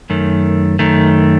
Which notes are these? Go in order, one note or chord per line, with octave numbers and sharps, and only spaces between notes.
F#2 D#3 A3
F#2 D#3 A3